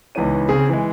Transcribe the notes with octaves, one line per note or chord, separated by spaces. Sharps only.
C#2 E3 B3 D#4 C#5 D#7
C#3 C4 G#4
E3 G#3